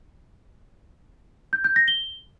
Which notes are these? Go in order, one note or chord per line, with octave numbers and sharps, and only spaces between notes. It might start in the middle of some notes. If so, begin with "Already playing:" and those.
G6
G6
A#6
G7